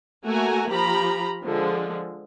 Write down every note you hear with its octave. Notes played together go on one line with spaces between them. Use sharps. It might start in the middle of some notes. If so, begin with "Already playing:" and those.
A3 A#3 F#4 G#5 A#5
F3 G4 A#5 B5
D3 F3 G#3